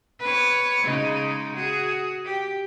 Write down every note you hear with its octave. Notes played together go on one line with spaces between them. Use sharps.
B4 C#5
C#3 G#3 D#4
F#4 G#4
G4